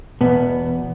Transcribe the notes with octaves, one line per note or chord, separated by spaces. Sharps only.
E2 B2 B3